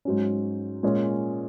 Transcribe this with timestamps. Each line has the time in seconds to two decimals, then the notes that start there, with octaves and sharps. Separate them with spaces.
0.05 G#2 F#3 C#4
0.83 A#2 G#3 C#4